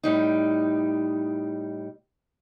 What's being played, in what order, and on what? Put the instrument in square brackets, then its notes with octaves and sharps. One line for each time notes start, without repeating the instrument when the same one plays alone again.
[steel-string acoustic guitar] A2 G3 D#4